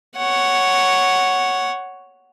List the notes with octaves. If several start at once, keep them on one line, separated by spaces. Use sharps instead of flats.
C#5 F#5